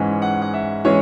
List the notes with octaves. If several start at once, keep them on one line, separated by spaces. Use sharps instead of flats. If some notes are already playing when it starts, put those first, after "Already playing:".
Already playing: G#2 E3 G#3 C#4
F#5
F#5
E5
E3 G#3 C#4 C#5